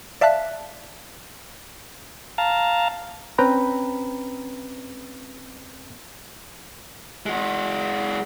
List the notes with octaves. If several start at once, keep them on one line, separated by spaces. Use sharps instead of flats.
D5 E5 F5 A5 F#6 B6
F5 A5 A#5
C4 C#4 B4 G5 A#5 B5
G#3 F#4